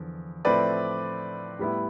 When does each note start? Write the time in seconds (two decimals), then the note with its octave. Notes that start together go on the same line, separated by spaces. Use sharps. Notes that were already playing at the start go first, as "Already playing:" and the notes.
Already playing: E2 D3 F3
0.45 A2 F3 A3 C4 E4 B4 D5
1.59 A2 G3 B3 E4